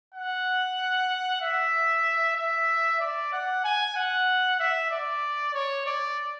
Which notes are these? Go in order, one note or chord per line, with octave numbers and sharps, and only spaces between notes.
F#5
E5
E5
D5
F#5
G#5
F#5
E5
D5
C#5
D5